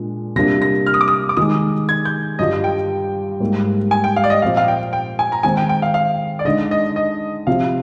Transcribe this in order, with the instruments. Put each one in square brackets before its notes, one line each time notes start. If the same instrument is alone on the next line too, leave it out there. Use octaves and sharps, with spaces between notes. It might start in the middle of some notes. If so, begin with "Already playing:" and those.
Already playing: [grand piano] A#2 G#3 D4
[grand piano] C3 G3 A#3 D4 F4 [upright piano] A#6
[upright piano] A#6
F6
D#6
D6
D#6
D6
[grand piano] D#3 G#3 D#4 [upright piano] D#6
[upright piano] G#6
G6
[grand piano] G2 D3 G3 D4 F4 [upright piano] D#5
[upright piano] G5
[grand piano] G#2 G3 A#3
[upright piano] G#5
G5
F5
D5
D#5
[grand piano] A#2 F3 C4 [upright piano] F5
[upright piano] F5
G5
G5
G#5
A#5
[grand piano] D#3 G#3 C4 [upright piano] G#5
[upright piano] G5
G5
F5
F5
D5
[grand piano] D3 G#3 D#4 [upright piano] D#5
[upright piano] D#5
D#5
[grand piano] C3 F3 C4 F4 [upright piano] F5